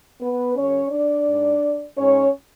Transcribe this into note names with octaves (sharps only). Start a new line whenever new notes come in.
B3 B4
F#2 C#3 C#4 C#5
D4 D5
G#2
G#2 C#4 C#5